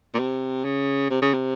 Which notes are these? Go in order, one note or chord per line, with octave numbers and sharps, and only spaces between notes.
A#2
C3
C#3
C3
C#3
C3